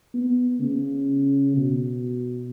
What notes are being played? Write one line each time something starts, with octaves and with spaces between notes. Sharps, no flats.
B3
C#3
B2